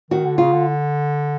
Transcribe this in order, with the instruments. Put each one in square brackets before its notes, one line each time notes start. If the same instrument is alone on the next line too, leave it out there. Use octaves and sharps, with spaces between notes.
[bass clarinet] D#3 [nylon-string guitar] F#4
[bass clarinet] D3
[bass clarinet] C#3 [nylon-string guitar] F4
[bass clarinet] D3